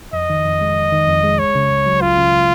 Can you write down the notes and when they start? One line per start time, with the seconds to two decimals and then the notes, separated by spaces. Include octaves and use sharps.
0.13 F2 D#5
0.30 D#3
0.45 F2
0.61 G#3
0.76 F2
0.92 D#3
1.07 F2
1.24 G#3
1.39 C#2 C#5
1.55 C#3
1.71 C#2
1.86 F#3
2.01 C#2 F4
2.17 C#3